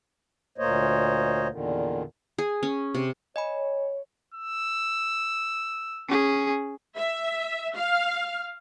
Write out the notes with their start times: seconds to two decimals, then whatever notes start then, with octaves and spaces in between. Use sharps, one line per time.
0.58 D2 A#2 A#3 C5 C#5 D#5
1.50 E2 A#2 D3 D#3
2.38 G#4
2.63 C#4
2.95 C3
3.36 C#5 D#5 G#5 B5
4.34 E6
6.08 C#4 G#4
6.97 E5
7.75 F5